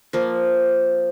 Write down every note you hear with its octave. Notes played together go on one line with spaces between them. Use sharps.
F3 A#3